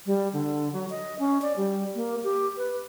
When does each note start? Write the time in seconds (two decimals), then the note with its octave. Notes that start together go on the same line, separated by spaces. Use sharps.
0.06 G3
0.33 D3
0.73 F#3
0.90 D#5
1.19 C#4
1.42 D5
1.57 G3
1.95 A#3
2.24 G4
2.57 B4